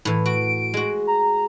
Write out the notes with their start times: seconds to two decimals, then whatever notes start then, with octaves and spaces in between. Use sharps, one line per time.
0.05 A2 E3
0.26 F#4 D7
0.74 G#3 F#4
1.07 A#5